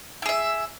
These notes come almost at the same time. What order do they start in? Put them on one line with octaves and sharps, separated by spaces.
E4 G#4 E5